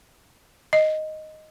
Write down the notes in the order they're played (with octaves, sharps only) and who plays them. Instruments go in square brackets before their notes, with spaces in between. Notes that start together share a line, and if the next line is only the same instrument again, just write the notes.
[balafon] D#5